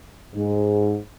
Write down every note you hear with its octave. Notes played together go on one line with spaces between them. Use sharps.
G#2